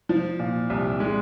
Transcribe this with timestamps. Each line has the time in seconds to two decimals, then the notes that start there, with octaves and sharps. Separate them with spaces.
0.09 F3
0.39 A#2
0.70 C2
1.00 G#3